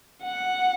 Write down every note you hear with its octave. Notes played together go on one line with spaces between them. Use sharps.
F#5